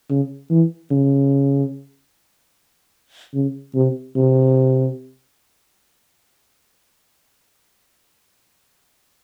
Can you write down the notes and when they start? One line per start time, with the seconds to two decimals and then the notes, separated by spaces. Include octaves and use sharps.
0.10 C#3
0.50 E3
0.91 C#3
3.34 C#3
3.75 C3
4.16 C3